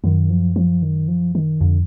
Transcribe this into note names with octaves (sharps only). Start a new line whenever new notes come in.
F#2 D#3
F3
F3
D#3
F3
D#3
F2 D3